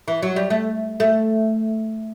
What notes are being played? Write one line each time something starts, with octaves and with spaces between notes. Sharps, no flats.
E3
F#3
G3
A3
A3